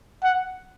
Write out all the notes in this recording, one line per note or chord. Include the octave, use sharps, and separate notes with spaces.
F#5